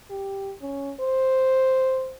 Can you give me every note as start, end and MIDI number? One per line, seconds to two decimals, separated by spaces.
0.10 0.53 67
0.62 0.93 61
1.00 2.16 72